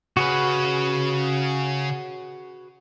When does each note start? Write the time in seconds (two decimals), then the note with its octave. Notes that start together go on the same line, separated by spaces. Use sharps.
0.17 C#3 C#4 F#4 G#4 B4